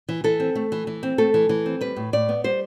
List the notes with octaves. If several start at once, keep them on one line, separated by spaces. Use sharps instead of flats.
E3
E3 A4
C4
A3
E3
E3
C4
A3 A4
E3
E3
C4
G3 B4
A2
A2 D5
B3
G3 C5